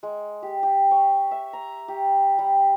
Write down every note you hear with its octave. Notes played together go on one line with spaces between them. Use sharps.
G#3
G4
G4
C#5
E5
A#5
G4
G3